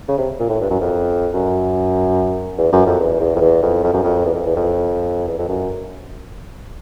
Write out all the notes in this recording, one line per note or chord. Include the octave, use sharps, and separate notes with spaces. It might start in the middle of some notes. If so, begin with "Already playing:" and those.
C#3
C3
A#2
A2
G2
F#2
F2
F#2
E2
F#2
F2
E2
E2
F2
E2
F2
F2
F#2
F2
E2
F2
E2
F2
E2
F2
F#2